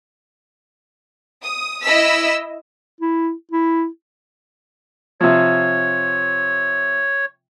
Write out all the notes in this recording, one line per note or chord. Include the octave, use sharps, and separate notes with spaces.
D#6
E4 D#5 E6 B6
E4
E4
C3 F3 C#5